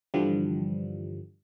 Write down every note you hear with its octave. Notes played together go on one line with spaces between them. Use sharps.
G2 D3 E3 F3 G3